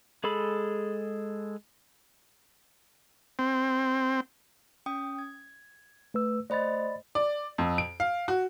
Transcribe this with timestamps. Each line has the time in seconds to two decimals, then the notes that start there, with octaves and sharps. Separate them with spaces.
0.24 G#3 G#4 A4 B5
3.39 C4
4.86 C#4 G5 D#6
5.19 G#6
6.14 A3 B4 E6
6.50 A3 C5 D5 D#5 B5 A6
7.15 D5
7.58 F2
7.78 D7
8.00 F5
8.28 F#4